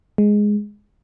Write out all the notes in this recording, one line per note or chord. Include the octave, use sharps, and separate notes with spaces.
G#3